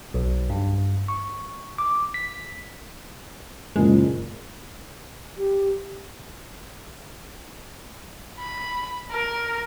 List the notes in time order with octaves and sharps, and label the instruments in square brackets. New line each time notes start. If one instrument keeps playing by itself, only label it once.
[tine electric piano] B1
G2
C#6
D6
B6
[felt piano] F#1 A#2 [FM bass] G#3
[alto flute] G4
[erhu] B5
A#4